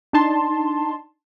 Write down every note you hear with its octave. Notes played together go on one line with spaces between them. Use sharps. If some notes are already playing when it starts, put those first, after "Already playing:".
D4 D#4 A5 C6